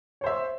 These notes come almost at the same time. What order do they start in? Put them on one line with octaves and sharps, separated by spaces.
C#5 C5 E5